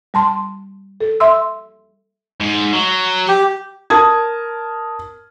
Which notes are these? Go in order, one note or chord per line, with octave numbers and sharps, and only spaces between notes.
G3 A5 C6
A4
E5 C6 E6
G#2
F#3
G4
A#4 A5 D#6 G#6